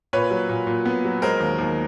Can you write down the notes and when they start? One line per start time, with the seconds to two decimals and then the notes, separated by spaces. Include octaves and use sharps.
0.13 A#2 B4 C#5
0.31 F#3
0.49 A#2
0.67 A#2
0.85 B3
1.05 F#3
1.22 G#3 A#4 C5
1.40 D#2
1.58 D#2